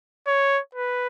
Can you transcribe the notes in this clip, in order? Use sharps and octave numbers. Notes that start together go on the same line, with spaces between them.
C#5
B4